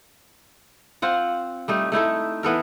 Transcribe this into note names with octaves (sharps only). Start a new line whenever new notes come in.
C4 F4 F#5
G3 A3 D#4
A3 D#4 E4 A4
E3 B3 A4 A#4